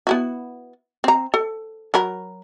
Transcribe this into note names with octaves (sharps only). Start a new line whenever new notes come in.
B3 E4 F#4
C4 A#5
A4
F#3 A#4 B5